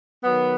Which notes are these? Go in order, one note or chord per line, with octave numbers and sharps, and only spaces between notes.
D#3 F#3 B3